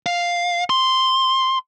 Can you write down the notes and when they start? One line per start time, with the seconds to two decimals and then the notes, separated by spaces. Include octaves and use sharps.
0.06 F5
0.70 C6